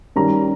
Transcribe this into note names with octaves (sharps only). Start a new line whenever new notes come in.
D#3 G3 C#4 A#5